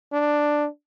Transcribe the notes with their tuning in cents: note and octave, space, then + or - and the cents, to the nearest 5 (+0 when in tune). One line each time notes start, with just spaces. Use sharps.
D4 +5